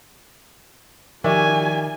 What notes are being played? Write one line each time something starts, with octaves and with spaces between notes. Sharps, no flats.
D#3 F3 G4 D5 E5 G#5 C#6